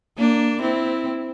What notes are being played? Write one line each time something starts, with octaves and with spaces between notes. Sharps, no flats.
A#3 D4
C4 E4